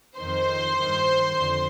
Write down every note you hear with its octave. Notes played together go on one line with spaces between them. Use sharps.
F2 D#3 C5 C6
G2 D#3
F2 D3